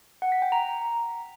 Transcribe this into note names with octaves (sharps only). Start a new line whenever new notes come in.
F#5
B6
G5
A#5